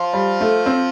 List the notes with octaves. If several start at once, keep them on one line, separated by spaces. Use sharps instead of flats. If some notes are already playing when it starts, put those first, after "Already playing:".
Already playing: F3 F4
G3
A3
C4